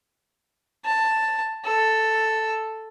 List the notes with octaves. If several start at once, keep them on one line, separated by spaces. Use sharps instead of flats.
A5
A4